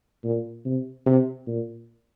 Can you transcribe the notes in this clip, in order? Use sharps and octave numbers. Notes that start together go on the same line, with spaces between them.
A#2
C3
C3
A#2